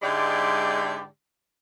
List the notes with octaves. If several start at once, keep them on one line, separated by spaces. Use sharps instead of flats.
G#2 D3 G#3 E4 G4 D5